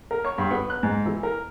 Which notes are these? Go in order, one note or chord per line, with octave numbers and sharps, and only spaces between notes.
A#4
C#5
G2
B3
F#6
G#2
E3
A#4